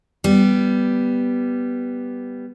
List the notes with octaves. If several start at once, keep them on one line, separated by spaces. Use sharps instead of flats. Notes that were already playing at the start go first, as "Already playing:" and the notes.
G3 B3